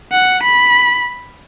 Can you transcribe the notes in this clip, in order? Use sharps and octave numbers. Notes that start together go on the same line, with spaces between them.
F#5
B5